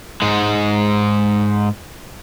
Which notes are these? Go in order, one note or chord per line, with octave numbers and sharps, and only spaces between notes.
G#2 G#3